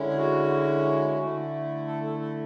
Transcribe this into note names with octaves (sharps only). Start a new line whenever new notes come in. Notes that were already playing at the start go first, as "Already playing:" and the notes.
Already playing: D3 G#3 C#4 E4
G#4
F#4
D3 A3 E4
A4
A4
A4